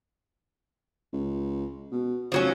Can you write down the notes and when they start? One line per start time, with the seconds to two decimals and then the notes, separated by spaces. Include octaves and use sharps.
1.13 C#2
1.92 B2
2.32 F1 F3 F#3 C#4